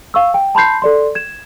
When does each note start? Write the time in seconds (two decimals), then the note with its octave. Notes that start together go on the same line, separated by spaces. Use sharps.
0.14 F5 C#6 E6
0.34 G5
0.55 A5 B5 C6 G6 C7
0.82 A4 D5 C6
1.15 G#6 E7